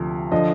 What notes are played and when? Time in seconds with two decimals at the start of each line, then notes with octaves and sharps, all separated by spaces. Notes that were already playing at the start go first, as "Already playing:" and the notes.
Already playing: D2 C3 F3
0.32 D3 F3 D#5